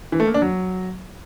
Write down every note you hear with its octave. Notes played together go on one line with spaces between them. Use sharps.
E3
A3
A#3
D4
F#3